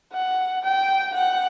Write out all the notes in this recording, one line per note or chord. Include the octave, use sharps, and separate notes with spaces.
F#5
G5
F#5